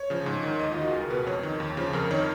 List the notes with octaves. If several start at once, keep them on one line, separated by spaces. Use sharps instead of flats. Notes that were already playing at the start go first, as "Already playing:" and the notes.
Already playing: C#5
C#3 F3
G#2
D#3
D#2 D#5
F4
D#3 F#4
C#2 G#4
A#4
B2 B4
F2 C#5
D#3
D#2
C#3 F3
F2 A#4
D#3 C#5